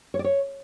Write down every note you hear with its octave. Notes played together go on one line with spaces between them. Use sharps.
C#5
D5
C#5